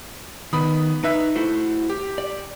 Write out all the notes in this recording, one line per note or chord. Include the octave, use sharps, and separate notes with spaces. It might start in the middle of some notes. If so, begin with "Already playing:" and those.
D#3 B3 B5 D#6
D#4 B4 E5 F#6
A3 E4 F#4 C5
G4
D5